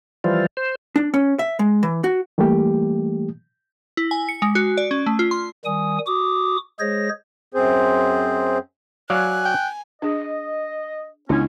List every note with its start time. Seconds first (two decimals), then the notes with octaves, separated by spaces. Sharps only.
0.24 E3 F3 G3 F4
0.57 C5
0.96 D4
1.14 C#4
1.39 E5
1.59 G#3
1.83 E3
2.04 F#4
2.38 E3 G3 A3 A#3 G4
3.97 E4
4.11 G#5
4.29 C#7
4.42 G#3
4.55 F#4
4.77 D5
4.91 C#4
5.06 A3
5.19 F4
5.31 C6
5.65 D#3 G3 G#5 D#6
6.07 F#4 D6 D#6
6.80 G#3 G#4 C5 C#5 A#6
7.54 F#2 C4 G#4 C5
9.10 F#3 D5 F5 G#5 F#6
9.45 G5
10.02 D4 G#4 D#5
11.29 C#2 B3 C#4 D4 E4